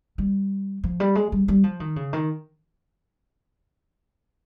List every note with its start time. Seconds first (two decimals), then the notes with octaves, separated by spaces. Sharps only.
0.18 G3
0.84 F3
1.00 G3
1.15 G#3
1.32 G3
1.48 G3
1.64 F3
1.80 D#3
1.96 C#3
2.13 D#3